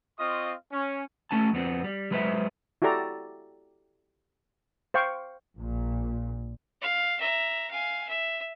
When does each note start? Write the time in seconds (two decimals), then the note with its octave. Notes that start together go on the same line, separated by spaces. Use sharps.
0.19 C4 F4 D#5 F5 C#6 D#6
0.72 C#4
1.31 A3 C#4 G#5 A5
1.53 F2 B3 C4
1.84 G3
2.11 F#3 G#3 B4 C5 D5 E5
2.82 E4 F#4 G4 A4 D5 A#5
4.94 C5 F5 G5 C#6
5.57 A#1 A#2
6.81 F5
7.21 E5 A#5
7.71 F5 G#5
8.09 E5